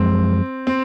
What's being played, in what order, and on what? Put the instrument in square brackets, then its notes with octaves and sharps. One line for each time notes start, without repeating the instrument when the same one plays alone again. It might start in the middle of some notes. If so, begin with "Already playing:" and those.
Already playing: [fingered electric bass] F#2 F3 G#3 [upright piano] C4
[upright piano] C4